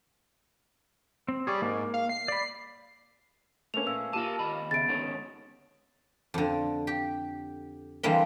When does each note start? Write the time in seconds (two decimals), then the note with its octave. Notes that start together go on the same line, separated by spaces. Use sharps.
1.28 C4
1.47 G3 G#4 C#5 D5
1.62 G#2 A#3
1.94 F5
2.09 C7
2.28 D5 B5
3.74 A3 A#3 C#4 B4 E5 F7
3.87 A#2 F5 E6
4.13 A#3 F4 G4 A#4 A5 D6 D#7
4.39 D#2 D#5 B5
4.71 C#3 B3 E5 A6 D7
4.88 G#2 D3 D#3 C#4
6.34 F2 D3
6.87 G4
8.03 D3 E3 G3 G#3 A#3 C4